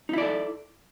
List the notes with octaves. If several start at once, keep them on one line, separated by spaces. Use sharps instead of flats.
D#4 E4 A4 D5